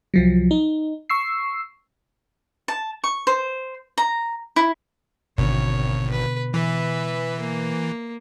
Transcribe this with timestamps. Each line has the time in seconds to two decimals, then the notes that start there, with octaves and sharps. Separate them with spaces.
0.14 C2 F3 F#3
0.51 D#4
1.10 C#6 E6 C7
2.68 A5
3.04 C#6
3.27 C5
3.98 A#5
4.56 E4
5.38 G#1 B2 D3 B3 C#5
6.11 B4
6.54 E3 B4 E5
7.40 A#3